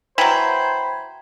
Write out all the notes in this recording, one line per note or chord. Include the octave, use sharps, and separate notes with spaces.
E3 F#3 C5 G5 A#5 B5 G#6